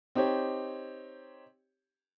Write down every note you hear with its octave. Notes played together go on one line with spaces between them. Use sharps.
C4 D#4 G4 C#5